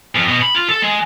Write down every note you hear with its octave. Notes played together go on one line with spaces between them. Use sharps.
F2
B2
B5
F4
A4
G#3